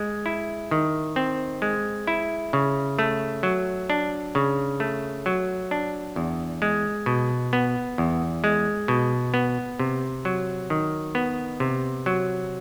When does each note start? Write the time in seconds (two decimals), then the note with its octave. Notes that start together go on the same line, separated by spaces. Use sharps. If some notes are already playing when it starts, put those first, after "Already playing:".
Already playing: G#3
0.26 E4
0.71 D#3
1.16 C4
1.62 G#3
2.07 E4
2.53 C#3
2.99 A3
3.43 F#3
3.90 D4
4.35 C#3
4.80 A3
5.26 F#3
5.71 D4
6.16 E2
6.62 G#3
7.06 B2
7.53 B3
7.98 E2
8.44 G#3
8.88 B2
9.34 B3
9.79 C3
10.25 F#3
10.70 D#3
11.15 B3
11.60 C3
12.06 F#3